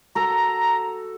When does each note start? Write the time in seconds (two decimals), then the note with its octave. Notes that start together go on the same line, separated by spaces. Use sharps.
0.15 F#4 A4 A#5